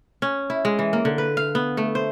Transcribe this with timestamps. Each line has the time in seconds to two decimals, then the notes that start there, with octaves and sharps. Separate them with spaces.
0.22 C#4
0.50 E4
0.65 G#3
0.79 E3
0.93 A#3
1.05 D3
1.18 B4
1.37 F5
1.55 B3
1.77 A3
1.95 C5